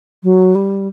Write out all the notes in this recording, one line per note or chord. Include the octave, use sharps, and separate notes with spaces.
F#3
G3